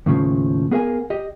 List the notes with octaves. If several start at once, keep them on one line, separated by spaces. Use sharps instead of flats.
D#2 A2 C#3 F3
B3 G#4 A#4 D#5 F5 G#5
G4 D#5